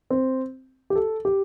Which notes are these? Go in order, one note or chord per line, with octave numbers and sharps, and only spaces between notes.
C4
G4
A4
G4